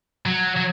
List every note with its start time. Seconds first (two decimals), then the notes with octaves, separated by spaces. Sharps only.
0.26 F#3
0.57 F#3